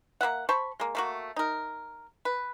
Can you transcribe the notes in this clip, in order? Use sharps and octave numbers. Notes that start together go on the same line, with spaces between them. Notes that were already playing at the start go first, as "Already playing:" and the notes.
A#3 B3 E5 F#5
C5 A5 B5 C#6
G#3 A#3
A3 A#3 F#4
D#4 A#4
B4